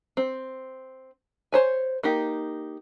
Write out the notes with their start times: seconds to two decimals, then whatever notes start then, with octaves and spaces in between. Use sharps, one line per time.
0.17 C4
1.52 C5 C#5 G#5
2.03 A#3 D#4 G4